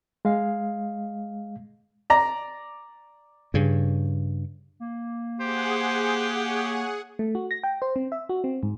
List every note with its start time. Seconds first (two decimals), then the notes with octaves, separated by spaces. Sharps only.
0.25 G#3 F5
2.10 D5 A#5
3.54 G2 C#3
4.80 A#3
5.40 G4 G#4 C5 F#5
6.49 C#5
7.19 A3
7.35 F#4
7.51 A#6
7.63 G5
7.82 C5
7.96 C4
8.12 E5
8.29 F#4
8.44 C4
8.63 G#2